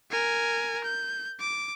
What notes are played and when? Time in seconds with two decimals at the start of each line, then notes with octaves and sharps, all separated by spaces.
0.11 A#4 G#5
0.84 G6
1.40 D6